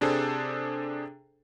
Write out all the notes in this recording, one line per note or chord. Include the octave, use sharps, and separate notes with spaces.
C3 D4 G#4 A4 C5